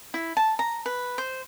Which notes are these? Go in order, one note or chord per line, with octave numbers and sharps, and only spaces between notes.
E4
A5
A#5
B4
C5